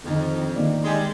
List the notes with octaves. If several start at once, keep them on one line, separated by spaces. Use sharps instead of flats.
F2 D3 D#3
D#3 A#3 D5
G3 G#3